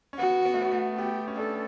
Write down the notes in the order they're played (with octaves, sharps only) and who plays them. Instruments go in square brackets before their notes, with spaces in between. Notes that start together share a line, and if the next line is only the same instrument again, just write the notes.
[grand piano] C#4
[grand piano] B3 [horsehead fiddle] F#4
[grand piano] B3
A3
B3
A3
[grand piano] B3 [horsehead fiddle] G4
[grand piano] C#4
[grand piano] D4 [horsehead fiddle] A4